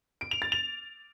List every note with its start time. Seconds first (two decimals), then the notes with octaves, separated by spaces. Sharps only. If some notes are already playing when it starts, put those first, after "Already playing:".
0.21 D7
0.31 F7
0.42 A6
0.52 F7